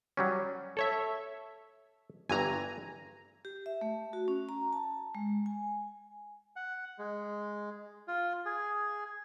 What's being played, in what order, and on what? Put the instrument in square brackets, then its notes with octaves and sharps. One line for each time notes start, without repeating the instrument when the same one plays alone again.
[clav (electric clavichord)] F#3 G3 C#4
[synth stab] A4 C#5 E5
[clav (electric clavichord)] G1 G2 E3 [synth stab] G#5 A#5
[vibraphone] G4
E5
A3
F#4
C#4
A#5
A5
G#3
G#5
[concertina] F#5
G#3
F4
G#4